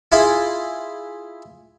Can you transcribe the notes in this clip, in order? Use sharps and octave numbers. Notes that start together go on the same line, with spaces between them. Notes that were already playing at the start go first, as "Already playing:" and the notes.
E4 F4 G#4